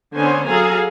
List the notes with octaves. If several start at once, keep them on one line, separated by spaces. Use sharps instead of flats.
D3 B3 C#4 C5 C#5 G#5
F#3 G#4 A4 F5 G#5 A#5